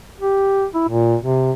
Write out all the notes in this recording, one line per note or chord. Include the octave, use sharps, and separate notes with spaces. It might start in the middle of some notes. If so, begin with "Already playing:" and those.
G4
E4
A#2
C3